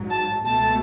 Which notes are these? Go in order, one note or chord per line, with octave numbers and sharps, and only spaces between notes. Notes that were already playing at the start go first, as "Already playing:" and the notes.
Already playing: A1 G#2 F#3
A5
C#2 B2 A3 A5